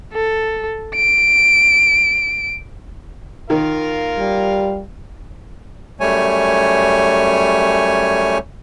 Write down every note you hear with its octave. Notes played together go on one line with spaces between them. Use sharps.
A4
D7
D#3 F4 A#4 F5
G3
F#2 G3 A3 C#5 G#5